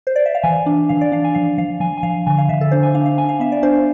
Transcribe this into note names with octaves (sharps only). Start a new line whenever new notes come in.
C5
D5
E5
F5
E3 G#5
D4
E3 F5
D5
D4 F5
G#5
F3 F5
F3 F5
F3 G#5
G#5
F3 F5
D3 G#5
F5
D3 E5
A4
D4 C5
G#5
D4 F5
F5
D4 G#5
F5
B3 E5
D5
D4 C5